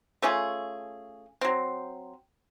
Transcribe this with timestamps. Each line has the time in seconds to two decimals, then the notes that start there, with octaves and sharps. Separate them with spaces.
0.22 A3 C#4 F4 G#4
1.41 F#3 C4